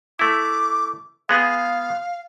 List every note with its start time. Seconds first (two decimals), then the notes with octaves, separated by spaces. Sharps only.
0.19 A3 E4 D6
1.29 G#3 B3 G#4 F5